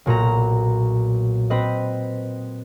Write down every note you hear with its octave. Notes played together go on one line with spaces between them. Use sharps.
B1 A#2 F#4 A#5
C4 B4 D#5